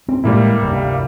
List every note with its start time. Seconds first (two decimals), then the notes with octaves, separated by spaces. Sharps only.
0.08 C4
0.24 A1 A2 G3 G#3 A#3 E4
0.62 F1 D2 G2